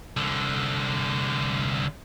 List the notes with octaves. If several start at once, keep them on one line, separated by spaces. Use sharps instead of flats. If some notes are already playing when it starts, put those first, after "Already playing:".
C2 D3